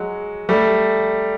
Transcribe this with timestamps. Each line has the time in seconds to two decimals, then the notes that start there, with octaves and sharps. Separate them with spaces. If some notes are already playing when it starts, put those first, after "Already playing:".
Already playing: F#3 G#3
0.49 G3 A3